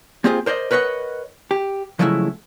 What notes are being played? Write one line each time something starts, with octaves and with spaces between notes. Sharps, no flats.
A#3 C4 F4 G4 G#4 C5
A#4 C5 D5 D#5
A#4 B4 C#5 D#5 F#5
G4
C#3 F3 F#3 G#3 A3 E4